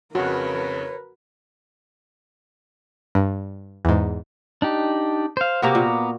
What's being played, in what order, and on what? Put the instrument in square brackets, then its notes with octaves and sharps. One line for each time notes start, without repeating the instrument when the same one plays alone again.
[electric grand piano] F2 C#3 [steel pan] F#4 [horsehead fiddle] A#4 B4 [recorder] C#5
[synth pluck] G2
E2 G#2
[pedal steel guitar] D4 D#4 G4
C5 F5
[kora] C3 A#3 F#4 [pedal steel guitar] B3 A#5 D6
[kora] A#2